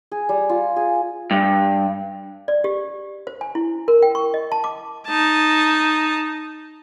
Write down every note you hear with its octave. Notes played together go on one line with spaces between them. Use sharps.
G#4
G3
F4
G#4
G2
D5
G4
C5
G#5
E4
A#4
G5
C#6
D#5
A5
D6
D#4 A5